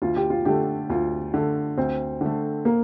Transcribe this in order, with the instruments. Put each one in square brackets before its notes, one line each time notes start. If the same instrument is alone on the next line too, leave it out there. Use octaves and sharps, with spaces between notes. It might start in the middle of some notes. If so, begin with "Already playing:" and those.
[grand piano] D2 [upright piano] F4
[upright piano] G4
F4
[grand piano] D3 A3 [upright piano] G4
[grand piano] D2 [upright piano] F4
[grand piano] D3 A3
[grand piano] D2 [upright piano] C4
[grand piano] D3 A3
[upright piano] A#3